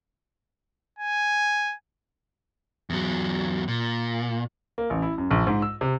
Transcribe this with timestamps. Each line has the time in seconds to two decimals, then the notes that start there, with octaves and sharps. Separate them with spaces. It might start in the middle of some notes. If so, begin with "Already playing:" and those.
0.99 G#5
2.90 E2 F#3
3.68 A#2
4.78 A#3
4.90 A1
5.02 E4
5.18 F#2
5.31 A#1
5.47 G#2
5.62 E6
5.81 C3